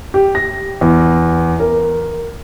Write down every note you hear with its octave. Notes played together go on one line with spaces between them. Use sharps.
G4
A#6
E2
A#4